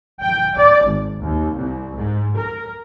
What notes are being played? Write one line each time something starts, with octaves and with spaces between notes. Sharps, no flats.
G5
D5
G#1
D#2
C2
G#2
A#4